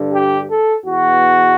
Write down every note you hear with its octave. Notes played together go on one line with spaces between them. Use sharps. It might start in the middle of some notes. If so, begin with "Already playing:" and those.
Already playing: G2 D3
G4
A4
E2 B2 F#4